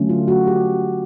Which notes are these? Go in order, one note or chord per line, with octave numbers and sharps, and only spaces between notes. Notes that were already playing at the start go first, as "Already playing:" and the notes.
Already playing: D3 F#3 A3 C#4
F4
F#4
G4